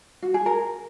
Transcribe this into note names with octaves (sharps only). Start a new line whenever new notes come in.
F#4
G#4
A#4